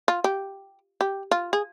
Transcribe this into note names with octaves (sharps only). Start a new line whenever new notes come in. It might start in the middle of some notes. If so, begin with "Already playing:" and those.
F4
G4
G4
F4
G#4